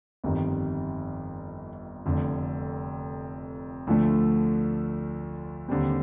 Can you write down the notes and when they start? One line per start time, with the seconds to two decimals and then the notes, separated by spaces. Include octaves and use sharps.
0.24 G1 F2 D#3 G3
2.05 F1 F2 D3
3.87 D2 D3 F3 A3 D4
5.68 D#2 D3 G3 C4